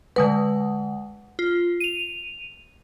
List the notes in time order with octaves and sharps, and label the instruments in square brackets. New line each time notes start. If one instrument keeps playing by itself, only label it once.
[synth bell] D3 G#3 F#5 [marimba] B4
[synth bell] F4
D#7 F7